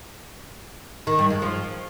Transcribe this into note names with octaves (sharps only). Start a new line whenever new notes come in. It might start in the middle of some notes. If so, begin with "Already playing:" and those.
D#3
G2
G#3
F3